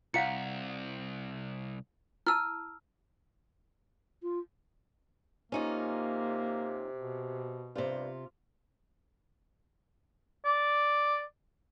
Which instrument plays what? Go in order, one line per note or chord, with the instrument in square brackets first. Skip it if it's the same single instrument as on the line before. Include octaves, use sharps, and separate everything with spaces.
[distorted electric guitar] C2 [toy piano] E4 F5 F#5 [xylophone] C#7
[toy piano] E4 A5 [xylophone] E6 F6
[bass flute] F4
[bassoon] C3 [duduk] A#3 [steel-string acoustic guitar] C#4 D#4 F4
[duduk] B2
[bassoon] G2 [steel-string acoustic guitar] C3 F4
[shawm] D5